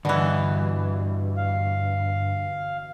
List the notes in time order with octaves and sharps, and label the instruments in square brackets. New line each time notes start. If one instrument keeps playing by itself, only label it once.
[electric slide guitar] G2 [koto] B2 E3 [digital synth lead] D3
[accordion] F5